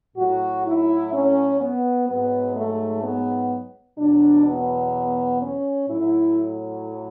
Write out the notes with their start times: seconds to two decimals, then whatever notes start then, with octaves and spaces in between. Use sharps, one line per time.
0.16 A2 F#3 F#4
0.64 E4
1.12 C#4
1.59 B3
2.07 G#2 F#3 B3
2.54 A3
3.02 B3
3.97 E2 B2 F#3 D4
4.45 B3
5.40 C#4
5.88 A2 F#3 E4